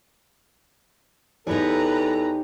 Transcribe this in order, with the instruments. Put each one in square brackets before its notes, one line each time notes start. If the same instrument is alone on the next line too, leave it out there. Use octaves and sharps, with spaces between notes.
[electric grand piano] E2 [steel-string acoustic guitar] D#4 G4 C#5 [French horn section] A4 [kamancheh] B4 A#5